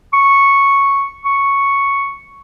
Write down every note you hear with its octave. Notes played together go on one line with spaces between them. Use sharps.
C#6
C#6